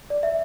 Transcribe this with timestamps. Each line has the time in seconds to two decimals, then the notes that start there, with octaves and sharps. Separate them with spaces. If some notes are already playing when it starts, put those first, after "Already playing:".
0.10 D5
0.23 E5